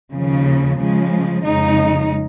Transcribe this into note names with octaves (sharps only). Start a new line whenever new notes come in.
D#2 C#3 F3
C#3 F3 G#3
F2 C#3 G#3 D#4